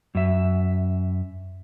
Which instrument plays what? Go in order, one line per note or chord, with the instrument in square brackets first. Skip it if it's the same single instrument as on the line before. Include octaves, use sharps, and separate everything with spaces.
[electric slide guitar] F#2 E5